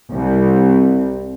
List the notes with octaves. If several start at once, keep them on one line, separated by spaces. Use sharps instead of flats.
C2